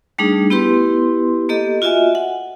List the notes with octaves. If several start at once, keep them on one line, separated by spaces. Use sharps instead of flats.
G3 A3 D4 D#4 G#4
B3 E4 G4 B4 C6
A#3 G4 A4 D#5
F4 F#4 D#5 E5 G#5
F#5